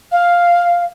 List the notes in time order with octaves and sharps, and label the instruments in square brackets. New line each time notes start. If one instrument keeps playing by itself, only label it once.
[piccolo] F5